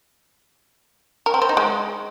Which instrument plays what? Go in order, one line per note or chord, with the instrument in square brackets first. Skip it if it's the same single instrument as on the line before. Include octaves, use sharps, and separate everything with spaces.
[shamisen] A#4
C4
C5
D#4
G#3